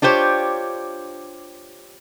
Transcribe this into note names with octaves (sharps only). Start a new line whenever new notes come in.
D4 F4 G4 C5 C#5